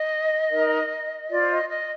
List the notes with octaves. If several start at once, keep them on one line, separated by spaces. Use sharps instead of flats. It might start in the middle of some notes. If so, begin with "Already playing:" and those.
Already playing: D#5
D#4 A#4
F4 C5 D5
D#5
D#5